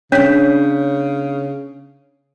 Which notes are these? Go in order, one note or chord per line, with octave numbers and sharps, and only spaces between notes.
C#3 B3 C#4 D4 C#5 G6 B6